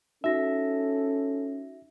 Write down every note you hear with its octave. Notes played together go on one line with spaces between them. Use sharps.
C#4 D#4 F#4 A4 E5 A#6